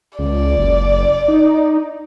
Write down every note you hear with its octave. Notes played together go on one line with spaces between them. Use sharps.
C#2 D5
F#1
D#4